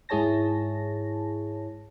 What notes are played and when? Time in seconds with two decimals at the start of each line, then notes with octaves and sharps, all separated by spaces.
0.09 G#2 E4 G#4 C#5 A5 A#6